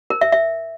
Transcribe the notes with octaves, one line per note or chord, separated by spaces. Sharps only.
A#4
E5
E5